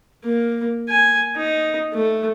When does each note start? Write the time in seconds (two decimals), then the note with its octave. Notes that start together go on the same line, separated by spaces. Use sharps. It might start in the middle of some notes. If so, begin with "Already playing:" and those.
0.24 A#3
0.89 G#5
1.36 D#4
1.94 A3